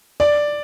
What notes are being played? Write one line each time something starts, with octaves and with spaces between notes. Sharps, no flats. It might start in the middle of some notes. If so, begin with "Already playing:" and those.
D5